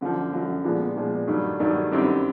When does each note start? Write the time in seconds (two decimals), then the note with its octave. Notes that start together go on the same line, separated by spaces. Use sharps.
0.01 F#2 D3 F3
0.33 F#2 D3 F3
0.64 A#2 F3 G#3 B3 D4
0.96 A#2 F3 G#3 B3 D4
1.28 G2 D#3 F#3 A3 D4
1.59 G2 D#3 F#3 A3 D4
1.91 F#2 D#3 G3 C4 E4